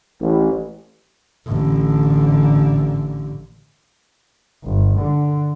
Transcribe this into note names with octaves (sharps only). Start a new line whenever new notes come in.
A1
A1 D3
G1
D3